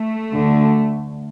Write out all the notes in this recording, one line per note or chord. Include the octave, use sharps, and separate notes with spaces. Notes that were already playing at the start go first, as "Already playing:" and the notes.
Already playing: A3
D2 D3